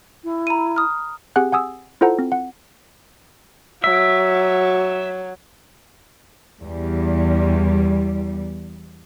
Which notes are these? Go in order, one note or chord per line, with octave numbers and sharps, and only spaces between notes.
E4
A#5 B5 D#7
D#6 F6
C4 G4 G#4 F#5 G#5 F#6
F#5 G#5 D#6 E6
E4 F4 A4 C5 F#5 A#5
C4
F#5
F#3 E5
E2 G3